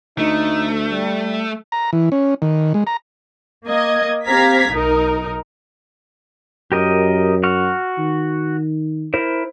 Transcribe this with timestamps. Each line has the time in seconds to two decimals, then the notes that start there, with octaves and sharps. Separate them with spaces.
0.18 D2 A3 D#4
0.90 G3
1.72 A#5
1.93 E3
2.12 C#4
2.42 D#3
2.74 G#3
2.87 A#5
3.66 A#3 D#5 G#6
4.26 C4 G4 F5 A#5 G#6 B6
4.70 B1 D#4 A#4
6.72 F#2 G4 A#4 D#5
7.43 F#4 C#6 F6
7.99 D#3
9.14 E4 A#4 C5